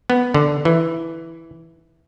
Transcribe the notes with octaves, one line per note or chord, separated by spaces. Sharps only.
B3
D3
E3